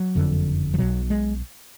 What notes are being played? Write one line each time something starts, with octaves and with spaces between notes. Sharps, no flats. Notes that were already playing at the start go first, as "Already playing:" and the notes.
Already playing: F#3
F#1 F2 D3
F3
B1 B2 F#3
G#3